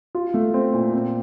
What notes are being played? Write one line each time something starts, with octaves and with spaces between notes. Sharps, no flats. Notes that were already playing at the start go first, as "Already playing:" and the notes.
F4
A3
C4
A#2
C4